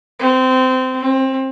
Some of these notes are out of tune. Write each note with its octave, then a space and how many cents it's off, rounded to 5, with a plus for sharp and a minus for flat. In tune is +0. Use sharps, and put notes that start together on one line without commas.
C4 -20
C4 +25